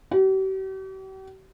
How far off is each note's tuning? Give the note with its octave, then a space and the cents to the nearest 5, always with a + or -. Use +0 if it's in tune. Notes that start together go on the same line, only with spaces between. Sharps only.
G4 -45